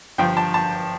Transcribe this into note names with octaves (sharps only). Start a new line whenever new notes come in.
G1 G2 D3 F3 G5
A5
A5